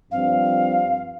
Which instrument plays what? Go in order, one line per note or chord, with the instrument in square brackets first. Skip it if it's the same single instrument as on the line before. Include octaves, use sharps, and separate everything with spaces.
[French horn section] G2 F3 C4 [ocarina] F5